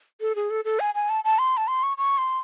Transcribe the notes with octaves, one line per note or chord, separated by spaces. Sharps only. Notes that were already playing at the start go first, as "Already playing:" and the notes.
A4
G#4
A4
A4
G#5
G#5
A5
A5
C6
A5
C6
C#6
C#6
C6